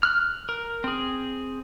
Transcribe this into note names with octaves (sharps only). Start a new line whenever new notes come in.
F6 F#6
A#4
C4 G#4